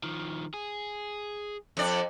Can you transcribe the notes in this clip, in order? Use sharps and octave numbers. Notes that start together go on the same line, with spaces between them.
D#3 F3
G#4
F2 D5